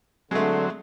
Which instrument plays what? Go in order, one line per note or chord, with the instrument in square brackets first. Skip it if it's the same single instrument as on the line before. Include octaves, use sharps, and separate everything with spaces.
[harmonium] D3 [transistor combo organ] F#3 C4 [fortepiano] G#3 A3